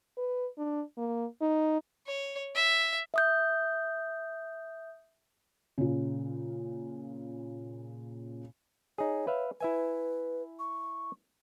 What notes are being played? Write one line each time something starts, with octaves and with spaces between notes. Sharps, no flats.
B4
D4
A#3
D#4
C#5
E5
E5 D#6 G6
A#2 C#3
D#4 G#4 C#5
B4 E5 F5
E4 B4 E5 G#5
C#6